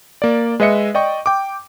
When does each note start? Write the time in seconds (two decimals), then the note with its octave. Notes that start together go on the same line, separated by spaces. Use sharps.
0.22 A#3 D5
0.60 G#3 B4 D#5 E5 C#7
0.94 D5 D#5 G5 C#6
1.26 G5 D6